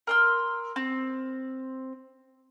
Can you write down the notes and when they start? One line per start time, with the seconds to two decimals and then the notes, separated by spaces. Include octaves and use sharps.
0.07 A#4 C6 E6
0.76 C4